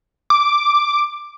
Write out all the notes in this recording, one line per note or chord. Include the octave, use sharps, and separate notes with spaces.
D6